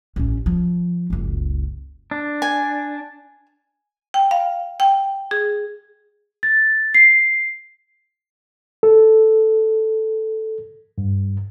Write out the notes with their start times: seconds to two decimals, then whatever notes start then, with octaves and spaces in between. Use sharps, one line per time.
0.16 A1 C#4
0.46 F3
1.10 F#1 C#2
2.11 D4
2.42 G#5
4.14 G5
4.31 F5
4.80 G5
5.31 G#4
6.43 A6
6.94 C7
8.83 A4
10.98 G2